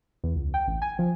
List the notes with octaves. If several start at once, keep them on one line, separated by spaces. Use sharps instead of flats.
E2
C#2
G5
A1
G#5
F3